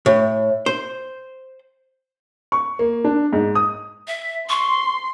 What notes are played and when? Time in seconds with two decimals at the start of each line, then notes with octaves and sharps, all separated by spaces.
0.06 A2
0.66 C5
2.52 C#6
2.79 A#3
3.05 D4
3.33 G#2
3.55 D#6
4.08 E5
4.49 C6 C#6